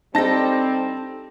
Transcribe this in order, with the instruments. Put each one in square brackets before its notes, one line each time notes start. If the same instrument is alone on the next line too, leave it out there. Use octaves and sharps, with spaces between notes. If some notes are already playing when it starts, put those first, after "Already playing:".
[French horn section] G3 C4 [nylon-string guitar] D#4 A4 [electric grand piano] A5 A#6